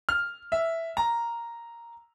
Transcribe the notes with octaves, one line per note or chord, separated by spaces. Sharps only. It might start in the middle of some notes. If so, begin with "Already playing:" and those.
F6
E5
A#5